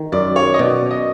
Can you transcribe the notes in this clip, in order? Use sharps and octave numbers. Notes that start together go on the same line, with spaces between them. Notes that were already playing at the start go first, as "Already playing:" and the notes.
Already playing: D#3
F#2 D5
C#5
D#5
B2 D5
D#5